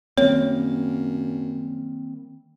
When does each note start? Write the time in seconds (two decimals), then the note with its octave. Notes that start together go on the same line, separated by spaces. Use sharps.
0.18 F#2 D#3 G3 A#3 C4 C#5